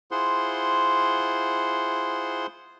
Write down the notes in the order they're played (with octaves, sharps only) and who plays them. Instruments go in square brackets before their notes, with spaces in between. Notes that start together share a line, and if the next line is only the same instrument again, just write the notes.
[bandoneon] E4 F4 G#4 C5 F#5 C6